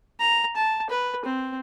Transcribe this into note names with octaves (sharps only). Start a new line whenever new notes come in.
A#5
A5
B4
C4